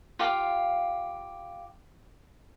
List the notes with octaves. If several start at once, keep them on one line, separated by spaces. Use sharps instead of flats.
F4 G4 F5